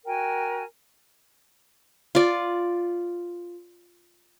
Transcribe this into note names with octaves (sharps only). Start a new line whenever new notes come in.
F#4 A#4 G5 G#5
F4 D5